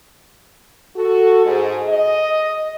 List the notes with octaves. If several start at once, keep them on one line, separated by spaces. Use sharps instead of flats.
F#4 A4
G#2 G#4
D#5